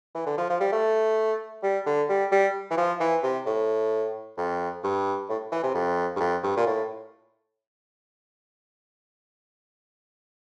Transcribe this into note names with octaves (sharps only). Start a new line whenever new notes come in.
E3
D3
F3
F3
G3
A3
G3
D3
G3
G3
E3
F3
E3
C3
A2
F2
G2
A2
E3
C3
F2
G2
F2
G2
A#2
A2